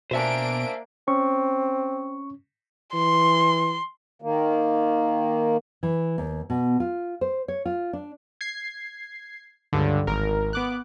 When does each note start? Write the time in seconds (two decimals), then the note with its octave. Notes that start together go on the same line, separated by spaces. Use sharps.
0.11 B2 A#3 D4 C5 E5 G#5 D7
1.08 C4 C#4 C#6
2.94 E3 C6
4.22 D#3 A#3
5.83 E3
6.18 D#2
6.50 B2
6.80 F4
7.21 C5
7.48 C#5
7.65 F4
7.93 D4
8.41 G#6 C7
9.73 C#2 G2 D3
10.07 G#1 A#4
10.53 B3 D6 F#6